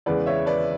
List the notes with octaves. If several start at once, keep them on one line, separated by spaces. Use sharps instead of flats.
E2 C#3 G#3 B4 D5
C#5 E5
B4 D5